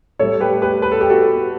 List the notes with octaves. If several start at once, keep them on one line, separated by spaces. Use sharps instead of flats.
A2 G3 A4 C#5
G4 B4
G4 B4
B4
A4
G4
F#4 A4